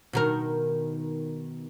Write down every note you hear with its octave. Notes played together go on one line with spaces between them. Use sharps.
B2 D#3 A#4